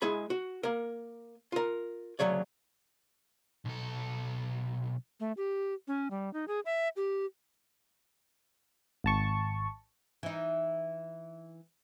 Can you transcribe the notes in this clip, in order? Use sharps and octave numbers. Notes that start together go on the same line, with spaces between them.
G#3 E4 G#4 B5
F#4
A#3 A#4
F4 A#4
D2 C#3 F#3 C#5 D5
B1 A4
A3
G4
C#4
G3
D#4
G#4
E5
G4
G#1 A5 C#6
E3 D#4